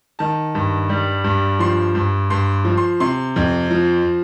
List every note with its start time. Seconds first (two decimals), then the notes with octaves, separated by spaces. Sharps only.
0.19 D#3 A5
0.55 G2
0.89 G3
1.24 G2
1.59 F3 C6
1.95 G2
2.30 G2 C6
2.65 F3
2.77 C6
3.00 C3 C6
3.36 F2
3.71 F3